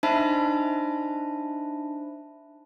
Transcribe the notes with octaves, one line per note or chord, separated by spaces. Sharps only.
D4 D#4 C5 E5 A5 B5